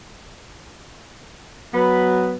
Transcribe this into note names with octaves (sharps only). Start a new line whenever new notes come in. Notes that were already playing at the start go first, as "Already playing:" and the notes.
F#3 B3 B4